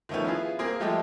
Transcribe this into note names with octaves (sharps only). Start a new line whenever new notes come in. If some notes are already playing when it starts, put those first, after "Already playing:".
D#3 F3 A3 B3 C#4
B3 E4 F4 G#4
A#3 C4 G#4
F3 G#3 A3 G4 A4 D#5